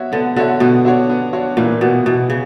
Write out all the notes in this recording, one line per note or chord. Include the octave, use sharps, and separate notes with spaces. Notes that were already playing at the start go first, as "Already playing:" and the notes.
Already playing: B3 F#4 C#5 E5
D3 B3
D3 F#4 C#5 E5
B2 B3
D4 F#4 C#5
B3
D4 F#4 C#5
A#2 E3
B2 B3 F#4
B2 E3
C#3